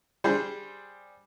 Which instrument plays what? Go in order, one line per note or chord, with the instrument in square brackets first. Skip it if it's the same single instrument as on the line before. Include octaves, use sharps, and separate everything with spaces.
[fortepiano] G3 D4 G#4 C5